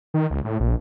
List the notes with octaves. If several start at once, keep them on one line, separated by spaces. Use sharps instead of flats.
D#3
C#2
A2
A#1